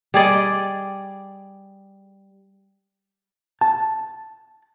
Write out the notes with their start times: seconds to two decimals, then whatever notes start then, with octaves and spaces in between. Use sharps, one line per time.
0.14 G3 G#4 D5 D#5
3.61 A5